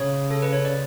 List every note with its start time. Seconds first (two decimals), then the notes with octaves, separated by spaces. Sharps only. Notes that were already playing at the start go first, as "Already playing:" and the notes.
Already playing: C#3 C#5
0.31 A4
0.42 B4
0.53 C#5
0.65 D5